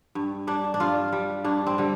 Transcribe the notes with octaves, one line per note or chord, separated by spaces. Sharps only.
G2
G3 D4
D4
G2 F4
G3
G2 D4
C4
D3 G3